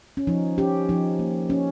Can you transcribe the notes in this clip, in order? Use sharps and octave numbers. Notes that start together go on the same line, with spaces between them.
C#4
F3 D#4
C#4 G4
F3 D#4
A#3
C#4